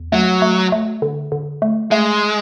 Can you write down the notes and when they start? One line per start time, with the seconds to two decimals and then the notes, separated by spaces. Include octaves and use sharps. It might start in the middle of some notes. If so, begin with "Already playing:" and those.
Already playing: E2
0.12 F#3 A3
0.42 A3
0.72 A3
1.02 D3
1.32 D3
1.62 A3
1.91 G#3 A3